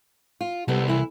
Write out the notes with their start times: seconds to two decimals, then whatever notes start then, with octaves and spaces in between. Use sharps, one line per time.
0.41 F4
0.68 C2 G3 B3 A4
0.88 E3 E4